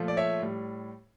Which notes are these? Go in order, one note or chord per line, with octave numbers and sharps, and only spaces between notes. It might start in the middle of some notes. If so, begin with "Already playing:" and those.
Already playing: A#2 F3 A3
D5
C#5 E5
A2 G3